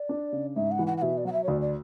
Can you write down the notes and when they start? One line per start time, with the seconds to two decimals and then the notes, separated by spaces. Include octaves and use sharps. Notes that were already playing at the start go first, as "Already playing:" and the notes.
Already playing: D5
0.09 D4
0.32 C#3
0.56 G#2 E5
0.71 F#5
0.79 E3
0.87 F#5
0.97 F#5
1.02 B2 E5
1.17 D5
1.25 F#3 F#5
1.33 E5
1.43 C#5
1.48 D2 D5
1.61 D5